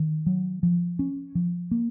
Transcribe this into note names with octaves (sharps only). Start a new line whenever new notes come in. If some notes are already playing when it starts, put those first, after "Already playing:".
Already playing: D#3
F#3
F3
C#4
F3
A#3